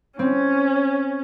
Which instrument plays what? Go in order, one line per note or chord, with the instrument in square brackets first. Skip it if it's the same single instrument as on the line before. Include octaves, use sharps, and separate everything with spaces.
[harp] C4 [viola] C#4